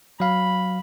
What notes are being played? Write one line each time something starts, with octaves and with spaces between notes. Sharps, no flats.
F#3 F5 B5